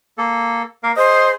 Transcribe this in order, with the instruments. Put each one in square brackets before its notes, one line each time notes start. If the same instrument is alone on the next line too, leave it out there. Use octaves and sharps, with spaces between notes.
[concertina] A#3 A4
A#3 A#4 F5
[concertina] G#4 [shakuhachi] C5 [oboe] D#5